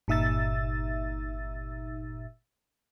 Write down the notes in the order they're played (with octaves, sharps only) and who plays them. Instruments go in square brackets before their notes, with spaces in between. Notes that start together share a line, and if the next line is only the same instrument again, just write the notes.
[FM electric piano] G1 A#2 D#4 E5 E6 A6